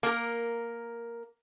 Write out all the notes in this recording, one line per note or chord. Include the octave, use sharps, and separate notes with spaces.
A#3 A#4